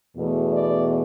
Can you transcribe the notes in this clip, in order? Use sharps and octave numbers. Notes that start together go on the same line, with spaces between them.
E2 B2 A3
D5